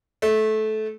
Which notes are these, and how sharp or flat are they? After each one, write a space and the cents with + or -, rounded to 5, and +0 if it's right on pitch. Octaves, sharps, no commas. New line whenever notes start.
A3 -20